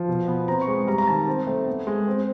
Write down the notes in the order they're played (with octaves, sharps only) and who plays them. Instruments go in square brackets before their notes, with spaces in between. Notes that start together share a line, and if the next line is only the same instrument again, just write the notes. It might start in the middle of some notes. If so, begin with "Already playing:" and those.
Already playing: [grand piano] F3
B2
B3
C4 A#5
C#6
G#3
G3 A#5
A#5
D#3 A5
C4
A3
B3
G#3
C4